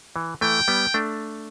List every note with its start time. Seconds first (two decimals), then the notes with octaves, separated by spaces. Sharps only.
0.16 E3
0.41 E3 A3 G5
0.68 G3 B3
0.94 A3 D4